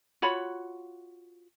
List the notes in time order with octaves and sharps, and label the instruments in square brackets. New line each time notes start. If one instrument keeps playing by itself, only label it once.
[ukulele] F4 F#4 C#5 B5